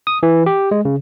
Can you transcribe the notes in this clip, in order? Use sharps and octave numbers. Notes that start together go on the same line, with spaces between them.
D#6
E3
G4
G#3
C#3